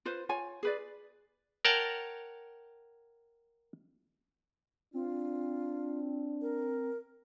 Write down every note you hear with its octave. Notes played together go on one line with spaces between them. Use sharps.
F4 B4 C5
F4 C#5 G#5
G#4 B4 D5
A#4 C#5 F#5 G5 A5
C4 D4 F4
A#4